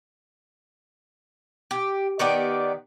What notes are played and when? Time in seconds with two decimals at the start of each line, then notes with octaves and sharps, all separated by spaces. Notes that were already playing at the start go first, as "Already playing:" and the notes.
1.71 G4
2.19 D#3 B3 G4 D5